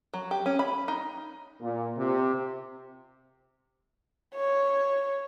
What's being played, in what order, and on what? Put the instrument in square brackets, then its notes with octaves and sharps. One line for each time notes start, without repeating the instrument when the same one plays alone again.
[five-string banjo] F#3
G4
C#4
B5
D#4
[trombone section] A#2
C3
[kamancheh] C#5